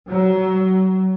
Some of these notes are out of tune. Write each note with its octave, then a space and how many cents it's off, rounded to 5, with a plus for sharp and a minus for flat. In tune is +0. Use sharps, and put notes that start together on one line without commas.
F#3 +25